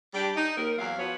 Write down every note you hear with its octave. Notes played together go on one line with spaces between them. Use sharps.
G3 D4 G4
D#4
D#2 A#4
E2 F#3 F5
F3 B3 F#4 C#5